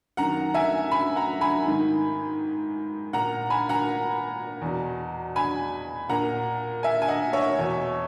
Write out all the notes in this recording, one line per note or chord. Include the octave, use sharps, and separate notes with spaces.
F#2 D#3 F#5 A#5
E5 G#5
G#5 B5
F#5 A#5
G#5 B5
G#2 D#3
A#2 F#5 A#5
G#5 B5
F#5 A#5
E2 B2
G#5 B5
A#2 F#5 A#5
E5 G#5
G#5
D#5 F#5
C#5 E5
E2 B2